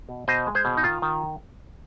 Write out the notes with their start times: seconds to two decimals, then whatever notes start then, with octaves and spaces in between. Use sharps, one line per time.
0.09 B2
0.28 B2 C5 D#5
0.47 G#3
0.55 G#4 C5
0.65 B2
0.77 D#4
0.83 D#3 F4
1.02 D#3